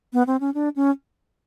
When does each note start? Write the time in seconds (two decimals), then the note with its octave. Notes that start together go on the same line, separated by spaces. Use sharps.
0.13 B3
0.27 C4
0.40 C#4
0.54 D4
0.76 C#4